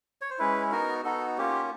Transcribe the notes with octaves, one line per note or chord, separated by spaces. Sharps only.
C#5
C5
G#3 C#4 E4 B4
B3 D#4 F#4 A#4
B3 D#4 F#4 A4
A#3 C#4 F4 G4